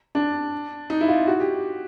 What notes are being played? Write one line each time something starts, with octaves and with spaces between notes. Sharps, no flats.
D4
D#4
E4
F4
F#4
G4